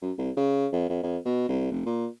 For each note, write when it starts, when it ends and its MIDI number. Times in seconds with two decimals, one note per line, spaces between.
0.02 0.12 42
0.18 0.31 36
0.37 0.67 49
0.72 0.89 41
0.90 1.02 41
1.03 1.18 41
1.25 1.47 47
1.49 1.71 36
1.71 1.82 29
1.86 2.07 46